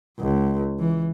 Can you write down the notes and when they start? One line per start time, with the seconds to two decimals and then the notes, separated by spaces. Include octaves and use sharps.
0.19 C#2
0.79 E3